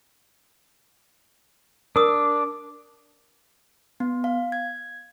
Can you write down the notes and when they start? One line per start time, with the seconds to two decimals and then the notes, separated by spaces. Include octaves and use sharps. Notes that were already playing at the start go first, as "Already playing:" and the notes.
1.96 D4 A#4 D#6
4.00 B3
4.24 F5
4.52 G#6